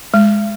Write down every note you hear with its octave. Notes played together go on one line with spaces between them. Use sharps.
G#3